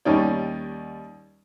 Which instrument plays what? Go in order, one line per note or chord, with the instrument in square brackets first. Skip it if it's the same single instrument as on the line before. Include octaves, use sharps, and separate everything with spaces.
[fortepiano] D#2 G3 C#4 D#4 D5